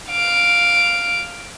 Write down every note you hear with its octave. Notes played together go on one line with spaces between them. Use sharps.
F5 D7